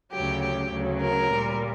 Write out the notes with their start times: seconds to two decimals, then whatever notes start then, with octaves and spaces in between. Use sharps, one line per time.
0.13 D2 C#3 F#3 G4
0.43 G4
0.72 D2 C#3 F#3
1.02 A#4
1.32 A#2 G3